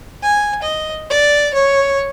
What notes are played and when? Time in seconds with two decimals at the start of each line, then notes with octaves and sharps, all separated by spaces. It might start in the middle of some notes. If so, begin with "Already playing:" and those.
0.23 G#5
0.62 D#5
1.10 D5
1.54 C#5